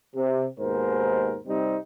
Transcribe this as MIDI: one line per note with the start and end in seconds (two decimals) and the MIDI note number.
0.16 0.46 48
0.59 1.36 39
0.59 1.36 44
0.59 1.36 47
0.59 1.36 70
0.59 1.36 72
1.47 1.76 48
1.47 1.76 55
1.47 1.76 60
1.47 1.76 63
1.47 1.76 67